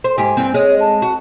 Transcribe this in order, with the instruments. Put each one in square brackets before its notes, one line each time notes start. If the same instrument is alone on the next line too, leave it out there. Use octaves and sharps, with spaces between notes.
[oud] C5
[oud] G#2 G4 [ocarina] G#5
[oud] G2 C4
[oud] G#3 [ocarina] C#5
[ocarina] A5
[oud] F#4